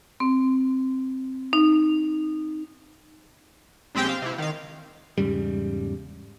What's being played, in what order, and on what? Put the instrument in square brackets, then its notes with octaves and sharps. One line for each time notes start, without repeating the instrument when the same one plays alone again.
[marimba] C4
D#4
[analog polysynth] B1 G#3 C4 G4 G5
C4 F5
C3 E4
D#3 F5
[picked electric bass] E2 G#2 C#3 G3